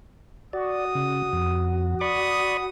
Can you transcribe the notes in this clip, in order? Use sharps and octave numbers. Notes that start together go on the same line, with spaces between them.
F#4 D5 D#6
C#3
F2
D5 B5 C#6 D#6